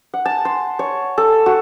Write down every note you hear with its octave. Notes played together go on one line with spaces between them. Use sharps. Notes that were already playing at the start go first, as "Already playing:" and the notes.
F#5
A5
C6
C#5
A4
F#4